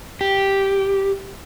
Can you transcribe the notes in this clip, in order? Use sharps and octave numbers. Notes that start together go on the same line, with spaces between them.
G4